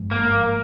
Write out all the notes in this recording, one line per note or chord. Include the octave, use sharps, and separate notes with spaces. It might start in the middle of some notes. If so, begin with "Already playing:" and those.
Already playing: G#1 G2 F3 G#3
A#3